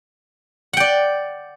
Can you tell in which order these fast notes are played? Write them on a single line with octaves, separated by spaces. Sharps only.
F#5 G5 D5